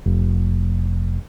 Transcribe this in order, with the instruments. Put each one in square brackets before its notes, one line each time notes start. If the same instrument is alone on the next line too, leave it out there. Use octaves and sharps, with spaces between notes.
[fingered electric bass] F1